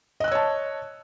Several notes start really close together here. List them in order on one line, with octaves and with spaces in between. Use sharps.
D#5 F#6 E6 C#5 A5